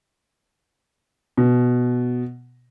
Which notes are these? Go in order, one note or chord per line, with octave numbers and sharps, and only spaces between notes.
B2